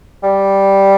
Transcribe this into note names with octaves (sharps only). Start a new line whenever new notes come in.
G3